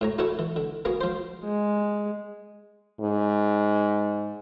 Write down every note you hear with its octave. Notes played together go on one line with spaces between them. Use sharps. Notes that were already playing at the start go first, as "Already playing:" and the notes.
A2 C#5 A#5
E4 F#4 A4 C#5 E5 F#5
E3
D3
A#3 B3 F#4 G#4
F3 C5
G#3
G#2